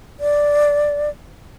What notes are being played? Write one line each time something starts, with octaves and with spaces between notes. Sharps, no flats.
D5